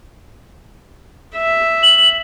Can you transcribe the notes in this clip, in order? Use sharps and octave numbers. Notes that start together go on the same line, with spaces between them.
E5
F#7